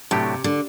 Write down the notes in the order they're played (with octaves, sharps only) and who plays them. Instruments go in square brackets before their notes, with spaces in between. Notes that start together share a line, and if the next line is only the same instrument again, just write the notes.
[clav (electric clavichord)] A2 F#3 A3 D4 G4 [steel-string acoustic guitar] C3
[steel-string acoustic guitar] D3